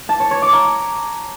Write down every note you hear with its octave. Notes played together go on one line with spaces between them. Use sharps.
A5
C#5
C#5
D6
A#5